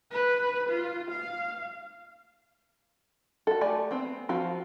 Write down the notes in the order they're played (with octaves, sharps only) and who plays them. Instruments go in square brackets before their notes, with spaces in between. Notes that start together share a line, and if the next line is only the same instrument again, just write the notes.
[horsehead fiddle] B4
F4
F5
[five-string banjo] F#4 A4
A3 G4 D5 G#5
B3 C4
F3 C4 F4 F#4